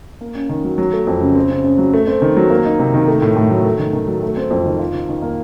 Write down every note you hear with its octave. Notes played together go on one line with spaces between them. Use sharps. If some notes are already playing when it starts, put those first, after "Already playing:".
A#3
C#4
D#3
F#3
F#3
A3
F2
C#3
C4
C#3
C#3
F#3
A3
C4
D#3
F#3
A#3
D#4
C3
D#3
A3
A2
A2
F#3
A3
D#3
D#3
F#3
A3
C4
F2
D#3
F4
D#3
D#3
A#3